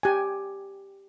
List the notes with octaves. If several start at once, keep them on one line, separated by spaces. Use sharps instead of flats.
G4 G#5